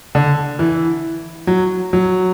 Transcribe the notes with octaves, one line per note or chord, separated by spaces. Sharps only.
D3
E3
F#3
F#3